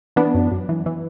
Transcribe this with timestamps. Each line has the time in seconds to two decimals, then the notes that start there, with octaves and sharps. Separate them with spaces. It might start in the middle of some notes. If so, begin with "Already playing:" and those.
0.16 E3 B3 D4
0.35 F#2
0.51 F#2
0.69 E3
0.86 E3